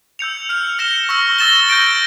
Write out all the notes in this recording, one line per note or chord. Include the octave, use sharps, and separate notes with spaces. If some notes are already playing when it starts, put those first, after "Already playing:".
E6 G6 C#7 F7
F6 C#7 F7
F6 A#6 C#7 E7 G7
C#6 E6 A#6
E6 A6 E7 G7
G6 A#6 D7 G7